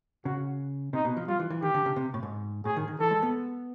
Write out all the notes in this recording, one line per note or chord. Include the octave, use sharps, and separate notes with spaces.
C#3 F#4
C3 D#4
B2
F3
G3 F4
E3
E3
D#3 G4
D3
C#3
C3
A2
G#2
A2 G#4
D#3
D#3
E3 A4
G#3
B3